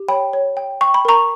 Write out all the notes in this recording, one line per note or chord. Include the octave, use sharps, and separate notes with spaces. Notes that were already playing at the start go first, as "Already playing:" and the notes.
Already playing: G4
C#5 G5 B5
C#5
G5
G5 C#6
B5
A#4 A#5 C#6